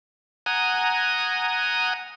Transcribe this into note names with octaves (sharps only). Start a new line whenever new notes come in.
F#5 G#5 A#5 D#6